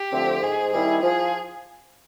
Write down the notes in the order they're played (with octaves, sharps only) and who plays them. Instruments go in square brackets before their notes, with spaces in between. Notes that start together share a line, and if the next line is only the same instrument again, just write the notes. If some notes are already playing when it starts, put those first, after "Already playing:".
Already playing: [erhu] G4
[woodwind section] D3 F3 A3 C4
[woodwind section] G#2 [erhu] G#4
[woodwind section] D#3 G3 C4 E4 [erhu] G#4
[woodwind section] F3 [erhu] G#4